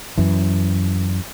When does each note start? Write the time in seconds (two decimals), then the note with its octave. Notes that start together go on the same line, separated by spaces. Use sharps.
0.18 F#2 E3